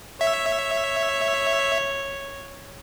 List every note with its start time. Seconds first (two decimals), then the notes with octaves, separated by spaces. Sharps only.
0.21 C#5 E5